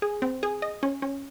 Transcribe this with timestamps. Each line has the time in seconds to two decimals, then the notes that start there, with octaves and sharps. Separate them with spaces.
0.02 G#4
0.22 C4
0.43 G#4
0.62 D#5
0.83 C#4
1.02 C#4